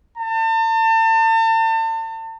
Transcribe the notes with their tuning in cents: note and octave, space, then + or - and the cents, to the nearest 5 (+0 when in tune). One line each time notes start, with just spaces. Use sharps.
A5 +40